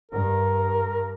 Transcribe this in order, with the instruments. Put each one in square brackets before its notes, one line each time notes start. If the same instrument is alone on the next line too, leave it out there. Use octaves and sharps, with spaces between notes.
[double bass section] G2 [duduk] A#4